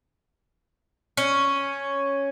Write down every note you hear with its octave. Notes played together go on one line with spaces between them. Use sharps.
C#4